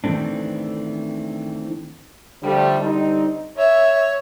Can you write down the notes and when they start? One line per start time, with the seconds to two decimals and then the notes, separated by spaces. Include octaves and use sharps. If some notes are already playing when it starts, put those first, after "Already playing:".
0.04 D#3 E3 A3 C4 D4
2.43 D3 F3 G3 A3
2.80 D3 G3 C4 D4 D#4
3.57 C#5 E5